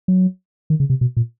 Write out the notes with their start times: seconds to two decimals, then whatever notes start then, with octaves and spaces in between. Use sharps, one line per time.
0.08 F#3
0.70 D#3
0.80 C#3
0.90 C3
1.01 B2
1.17 A#2